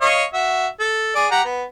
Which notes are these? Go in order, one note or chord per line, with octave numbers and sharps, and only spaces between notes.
C#5 D#5 F5
F#4 E5
A4
G#4 D5
G4 F#5 A#5
B3